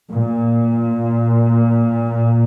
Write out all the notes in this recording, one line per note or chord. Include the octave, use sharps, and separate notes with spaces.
A#2